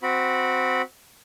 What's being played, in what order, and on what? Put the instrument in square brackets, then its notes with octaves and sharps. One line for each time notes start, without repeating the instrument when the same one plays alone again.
[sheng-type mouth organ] C4 F#4 B5